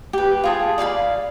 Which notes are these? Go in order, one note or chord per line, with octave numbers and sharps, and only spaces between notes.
G4 B4
F4 G#4 A5
D5 F5 G#5 B5